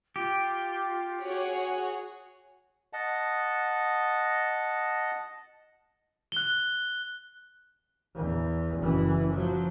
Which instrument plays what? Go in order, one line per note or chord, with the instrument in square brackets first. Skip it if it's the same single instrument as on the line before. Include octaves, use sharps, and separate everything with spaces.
[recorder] F4 [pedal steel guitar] G4
[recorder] F#4 [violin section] G#4 C#5 F#5
[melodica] D#5 F#5 A5
[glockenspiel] F#6 G7
[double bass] E2
F#1 E3
F3 F#3